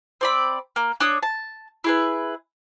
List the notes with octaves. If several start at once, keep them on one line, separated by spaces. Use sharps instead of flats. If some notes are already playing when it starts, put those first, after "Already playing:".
C4 D5 B5
A#3
D4 C#5 D#6
A5
E4 G#4 B4